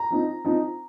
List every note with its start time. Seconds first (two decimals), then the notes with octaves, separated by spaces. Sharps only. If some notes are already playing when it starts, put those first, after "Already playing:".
Already playing: A#5
0.11 F3 C4 D#4
0.44 F3 C4 D#4